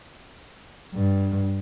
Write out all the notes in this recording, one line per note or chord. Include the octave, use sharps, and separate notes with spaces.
G2